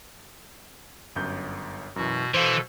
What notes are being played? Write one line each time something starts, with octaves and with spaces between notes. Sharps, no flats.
G1 F#2 G6
F#2 B2 E3 F#4
B2 E3 A4 C5 F5